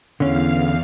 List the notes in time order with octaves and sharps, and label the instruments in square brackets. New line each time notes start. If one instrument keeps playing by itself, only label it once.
[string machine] E2 F5 [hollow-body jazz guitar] D3 C#4